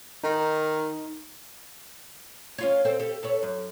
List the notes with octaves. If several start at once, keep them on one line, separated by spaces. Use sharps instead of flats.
D#3 D#4
C#4 F4 C#5
C4 A4 C5
G4 A4
A4 B4 C#5
F#2